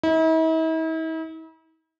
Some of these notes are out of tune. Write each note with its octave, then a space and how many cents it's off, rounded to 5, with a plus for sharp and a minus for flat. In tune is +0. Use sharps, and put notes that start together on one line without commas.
E4 -45